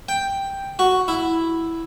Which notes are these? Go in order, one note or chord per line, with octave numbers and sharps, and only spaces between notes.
G5
F#4
E4